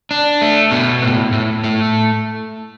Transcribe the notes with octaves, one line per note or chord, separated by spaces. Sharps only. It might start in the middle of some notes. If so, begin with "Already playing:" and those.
D4
A3
B2
A2
A2
A3